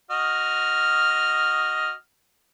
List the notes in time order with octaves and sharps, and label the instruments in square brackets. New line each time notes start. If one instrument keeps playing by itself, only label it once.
[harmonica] F#4 D#5 F6